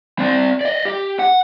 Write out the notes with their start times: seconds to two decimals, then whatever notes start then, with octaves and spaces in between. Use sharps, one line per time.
0.19 C4 D5
0.61 D5 D#5
0.85 G4
1.19 F#5